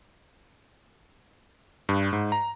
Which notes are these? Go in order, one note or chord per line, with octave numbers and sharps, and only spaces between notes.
G2
G#2
A#5